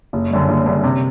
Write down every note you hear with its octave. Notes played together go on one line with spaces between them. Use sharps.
F#1
F#2 D3 G3
F#1
F#2 D3 G3
C3